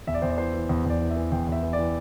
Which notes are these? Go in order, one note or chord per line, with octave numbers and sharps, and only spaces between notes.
E2 E5
D5
E2 C5
D5
E3 C5
E3
E2
E2 D5
E3
E5
E3
E2 G5
E2 E5
E3
D5
E3